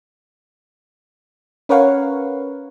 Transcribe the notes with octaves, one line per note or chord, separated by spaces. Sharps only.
C#4 A#4 B4 C#5 F5 F#5